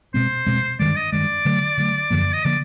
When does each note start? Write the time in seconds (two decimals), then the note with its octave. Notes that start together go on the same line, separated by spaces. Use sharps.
0.14 B2 G#3 C4 C5
0.47 B2 G#3 C4
0.80 G2 D#3 G#3 D5
0.96 D#5
1.12 G2 D#3 G#3 D5
1.45 D3 F#3 A3
1.78 D3 F#3 A3
2.10 F#2 D3 F3 A#3
2.33 D#5
2.44 D3 F3 A#3 D5